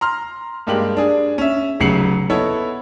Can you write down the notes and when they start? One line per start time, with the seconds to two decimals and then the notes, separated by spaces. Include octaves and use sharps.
0.01 A#5 C6 F6
0.67 G2 G#3 A#3 G4 F#7
0.97 D4 G#4
1.38 C#4 E5
1.80 F1 C#3 F#3 C7 C#7 F#7
2.30 B3 E4 A4 C#5 D#5